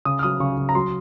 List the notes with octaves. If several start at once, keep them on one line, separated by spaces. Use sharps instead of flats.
C#3 D#6
F6
F#3 D#6
C#3 C#6
C#3
A#5
F#3 C6